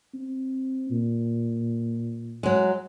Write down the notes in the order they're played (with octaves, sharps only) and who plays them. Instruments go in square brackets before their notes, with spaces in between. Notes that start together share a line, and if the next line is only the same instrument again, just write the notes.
[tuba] C4
A#2
[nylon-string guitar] F#3 G#3